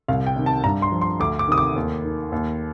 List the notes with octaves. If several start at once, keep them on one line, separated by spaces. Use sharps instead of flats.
C2 F5
G5
C3 D#3
A5
G2 A#5
C6
F3
C6
D2 D6
D6
C3 D#3 D#6
D6
D#2
D#3
D#2